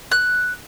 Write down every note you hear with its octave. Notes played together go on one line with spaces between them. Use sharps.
F#6